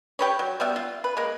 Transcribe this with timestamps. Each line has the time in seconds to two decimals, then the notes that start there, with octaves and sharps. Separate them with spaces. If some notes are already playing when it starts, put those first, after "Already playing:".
0.19 G4 B4 C#5
0.39 F#3
0.60 G3 B3 E5
0.76 F4
1.04 B4
1.17 G#3 A#3